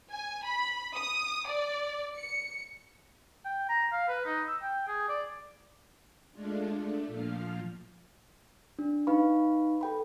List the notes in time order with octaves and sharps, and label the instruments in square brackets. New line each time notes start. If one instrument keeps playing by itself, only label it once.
[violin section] G#5
B5
D#6
D5
C#7
[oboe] G5
A#5
F5
B4
D#4
E6
G5
G#4
D5
[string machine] G#3 A3 D4 F4
A3 D4
A#2 F3 F5 F6
[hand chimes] D4
D#4 B4 F5 B5 C#6
A4 G5 B5